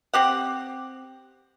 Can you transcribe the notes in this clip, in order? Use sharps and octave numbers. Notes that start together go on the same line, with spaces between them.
C4 G4 F#5